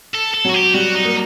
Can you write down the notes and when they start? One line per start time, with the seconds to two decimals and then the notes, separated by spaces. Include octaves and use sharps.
0.14 A4
0.34 A4
0.45 F#3 F#4
0.54 G4
0.74 G3 F#4
0.95 D#4
1.05 A#3